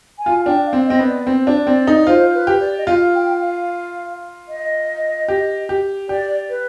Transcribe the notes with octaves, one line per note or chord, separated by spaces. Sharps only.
G#5
F4
D4 G5
F5
C4
C4 D#5
B3
D5
C4 C5
D4
C4 D5
D#4
D5
F4 C5
B4
G4
D5
D#5
F4 F5
G5
F5
D#5
G4
G4
G4 D5
B4